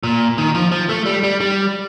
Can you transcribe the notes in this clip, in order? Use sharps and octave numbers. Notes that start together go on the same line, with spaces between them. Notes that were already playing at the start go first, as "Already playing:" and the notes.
A#2
D#3
F3
F3
A3
G3
G3
G3